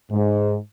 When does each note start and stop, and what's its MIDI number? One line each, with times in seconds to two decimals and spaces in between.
0.11 0.56 44